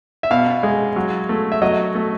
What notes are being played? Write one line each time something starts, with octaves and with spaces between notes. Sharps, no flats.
E5
B2 F5
G#3
F#3
A3
E5
F#3 D#5
A3